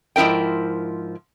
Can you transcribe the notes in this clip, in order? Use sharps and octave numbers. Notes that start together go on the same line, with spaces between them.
G#2 F3 E4 A#4 G5